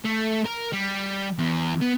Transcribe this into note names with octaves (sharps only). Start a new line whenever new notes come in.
A3
A#4
G3
E2
B3